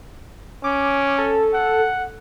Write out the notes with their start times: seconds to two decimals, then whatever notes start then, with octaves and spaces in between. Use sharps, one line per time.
0.64 C#4 D6
1.18 A4
1.54 F#5